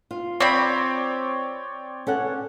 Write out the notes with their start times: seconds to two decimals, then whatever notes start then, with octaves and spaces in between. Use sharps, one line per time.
0.11 F4
0.40 C4 C#5 D5 G5 B5
2.07 C#4 A4 F#5